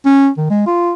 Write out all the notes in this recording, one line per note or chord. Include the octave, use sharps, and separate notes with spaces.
C#4
D#3
G#3
F4